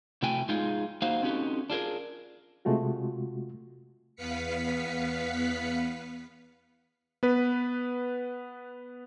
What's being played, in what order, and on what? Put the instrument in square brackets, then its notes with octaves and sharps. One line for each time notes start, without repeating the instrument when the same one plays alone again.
[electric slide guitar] C3 A3 E4 F#4 G5 G#5
G#3 D#4 F4 G#4
A#3 D#4 F#4 C5 F5
C4 C#4 D#4 F#4 G4 A4
D4 F4 G#4 A#4
[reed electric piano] C3 G#3 A3 F4 F#4
[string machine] E2 B3 B4 F5 B6 C#7
[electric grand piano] B3 B4